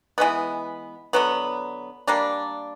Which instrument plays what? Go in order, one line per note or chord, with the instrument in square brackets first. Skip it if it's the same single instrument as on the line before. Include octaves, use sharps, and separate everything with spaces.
[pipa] E3 G#3 B3
D3 F#3 B3
G3 A#3 D4